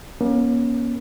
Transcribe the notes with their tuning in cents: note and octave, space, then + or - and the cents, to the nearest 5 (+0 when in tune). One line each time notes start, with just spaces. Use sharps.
A#3 +40 C#4 +0